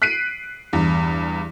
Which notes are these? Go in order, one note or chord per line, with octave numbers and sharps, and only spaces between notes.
F#6 B6 C7 D7 D#7
E2 G2